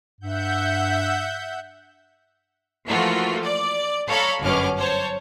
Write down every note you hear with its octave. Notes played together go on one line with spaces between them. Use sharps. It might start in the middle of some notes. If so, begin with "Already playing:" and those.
G2 E5 F#5 G6
E3 F3 A3 A#3 F4 F#4
D5
A4 C#5 F5 A#5 B5
G1 F#2 B2 C#4 D6 F6
C5 C#5 A5